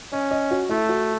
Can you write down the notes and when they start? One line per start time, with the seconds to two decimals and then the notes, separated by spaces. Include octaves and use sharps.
0.12 C#4 D#5
0.31 D#5
0.51 F#4
0.69 A3 E4
0.89 F#4